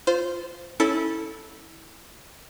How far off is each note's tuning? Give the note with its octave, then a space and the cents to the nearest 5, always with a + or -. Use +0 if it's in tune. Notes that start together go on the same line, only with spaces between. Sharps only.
F4 +0 C5 -15
C#4 +0 E4 -20 A4 +0